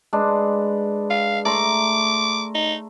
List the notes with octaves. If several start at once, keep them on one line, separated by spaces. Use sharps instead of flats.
G#3 D4 B4
F5
A3 A#5 C6 D6
D#4